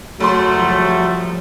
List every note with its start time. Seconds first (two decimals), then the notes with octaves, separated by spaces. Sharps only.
0.20 F#1 F#3 A3 C6
0.57 F3 G3